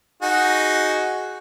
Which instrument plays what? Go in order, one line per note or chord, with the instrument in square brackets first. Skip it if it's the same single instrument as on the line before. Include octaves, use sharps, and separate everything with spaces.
[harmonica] D#4 F#4 G#4